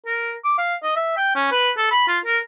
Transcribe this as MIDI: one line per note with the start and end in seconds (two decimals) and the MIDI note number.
0.06 0.34 70
0.44 0.54 86
0.58 0.75 77
0.83 0.94 75
0.96 1.12 76
1.17 1.34 79
1.35 1.47 61
1.52 1.71 71
1.77 1.88 69
1.91 2.03 83
2.08 2.19 65
2.25 2.39 70